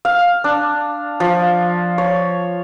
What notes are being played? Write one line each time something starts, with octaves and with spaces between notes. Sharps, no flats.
F5
D4
F3
C#5